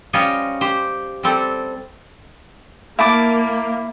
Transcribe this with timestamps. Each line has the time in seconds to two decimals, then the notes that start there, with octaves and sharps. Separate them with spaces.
0.13 G3 C#4 F4 C5 C#5 D#5
0.61 G4 C5
1.23 G3 C4 A4
2.99 A#3 E4 A5 D6